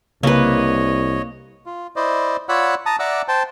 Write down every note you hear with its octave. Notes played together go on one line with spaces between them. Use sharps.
C2 C#3 A#3 B4 C#5 D#5
F4
E4 C5 D5 D#5
F4 C#5 D5 F#5 B5 E6
A5 A#5 D#6
D5 E5 F#5 A#5 D6 E6
C5 G5 A5